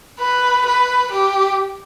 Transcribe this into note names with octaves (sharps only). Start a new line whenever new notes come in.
B4
B4
G4